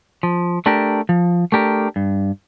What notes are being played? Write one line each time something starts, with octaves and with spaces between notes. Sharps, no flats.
F3
A3 D4 G4 A#4
F3
A3 D4 G4 A#4
G2